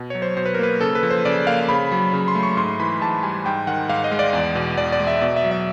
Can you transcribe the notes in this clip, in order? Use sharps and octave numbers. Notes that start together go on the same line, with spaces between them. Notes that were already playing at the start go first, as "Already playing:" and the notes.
Already playing: B2
F#3 C#5
C5
B2 C5
B4
A#4
A#3 B4
C#3 A4
B4
F3
C5
C#3 D5
A#3 F5
C#3 B5
F#3
C#3
C6
A3
C#6
G#2 C6
E3 B5
G#2 A5
G3 G#5
G#2 G5
D#3 F#5
G#2 F5
D#5
G#3
D5
E2
B2
E2 D5
D5
G#3
E5
B2 D5
E5
F#3
E5